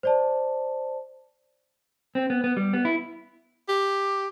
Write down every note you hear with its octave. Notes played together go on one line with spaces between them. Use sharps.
C5 D5 A5
C4
B3
B3
G3
B3
E4
G4